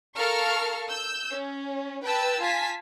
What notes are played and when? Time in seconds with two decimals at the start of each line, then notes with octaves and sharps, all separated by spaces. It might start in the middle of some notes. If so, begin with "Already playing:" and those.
0.15 A4 A#4 F5 C#6 F6
0.89 E6 G6
1.32 C#4
2.03 B4 G5 A5 E6
2.42 F4 G#5 A5 B6